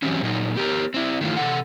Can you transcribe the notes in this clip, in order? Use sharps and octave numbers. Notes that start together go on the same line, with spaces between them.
E3 F#3 G3 C4 C#4
A#2 F#3 D#4
B3 G4 A#4
C4 E4
D#3 E3 A3 E4 F4
C3 A4 F#5